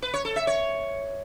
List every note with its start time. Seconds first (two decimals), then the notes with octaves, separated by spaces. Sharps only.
0.02 B4
0.14 C#5
0.25 A4
0.36 E5
0.47 C#5